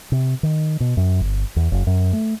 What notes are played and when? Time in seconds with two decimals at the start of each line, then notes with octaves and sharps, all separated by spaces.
0.12 C3
0.43 D#3
0.80 B2
0.97 F#2
1.20 G1
1.56 E2
1.72 F#1
1.87 F#2
2.13 A3